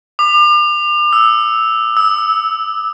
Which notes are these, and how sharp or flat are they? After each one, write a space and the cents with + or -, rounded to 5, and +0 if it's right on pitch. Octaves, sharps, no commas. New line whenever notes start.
D6 +40
E6 -5
E6 -20